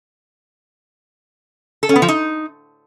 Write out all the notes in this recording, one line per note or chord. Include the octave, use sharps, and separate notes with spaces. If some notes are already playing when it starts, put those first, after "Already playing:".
A4
C#4
B3
F3
D#4